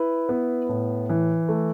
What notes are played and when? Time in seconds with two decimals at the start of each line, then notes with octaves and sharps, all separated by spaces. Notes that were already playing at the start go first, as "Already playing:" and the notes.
Already playing: E4 B4
0.29 B3
0.69 A2
1.09 E3
1.49 A3